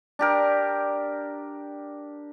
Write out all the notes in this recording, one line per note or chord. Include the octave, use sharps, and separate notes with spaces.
D4 G4 A#4